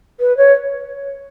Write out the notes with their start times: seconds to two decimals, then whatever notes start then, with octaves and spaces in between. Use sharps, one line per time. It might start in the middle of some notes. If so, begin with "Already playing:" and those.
0.20 B4
0.37 C#5